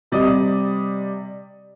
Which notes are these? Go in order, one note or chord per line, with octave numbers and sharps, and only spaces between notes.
C3 G3 D5 D#5 D#6